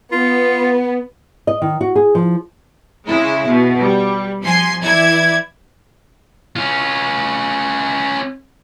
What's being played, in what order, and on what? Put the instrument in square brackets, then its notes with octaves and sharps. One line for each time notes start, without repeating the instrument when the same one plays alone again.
[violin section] B3 [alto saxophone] F4
[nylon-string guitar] D#5
D#3
F#4
G#4
F3
[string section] C#3 G#3 E4
B2
G3
F3 G#5 C6 C7
E3 E4 D5 G#6
[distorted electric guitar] C#4 F4